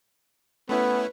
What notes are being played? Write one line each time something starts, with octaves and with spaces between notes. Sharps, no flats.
A3 B3 C#4 E4 B4